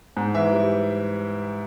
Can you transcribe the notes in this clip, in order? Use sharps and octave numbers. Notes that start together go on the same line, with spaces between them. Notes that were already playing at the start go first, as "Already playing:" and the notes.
G#2
E3 E5
G3